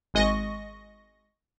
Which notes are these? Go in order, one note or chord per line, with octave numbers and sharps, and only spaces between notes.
G#1 G#3 D#5 C#6 A#6